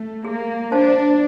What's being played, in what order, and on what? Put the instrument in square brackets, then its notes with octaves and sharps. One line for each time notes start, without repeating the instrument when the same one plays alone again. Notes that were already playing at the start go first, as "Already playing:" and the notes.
Already playing: [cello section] A3
[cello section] A#3 [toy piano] G#4
[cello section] D4 [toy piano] C5 F5 A5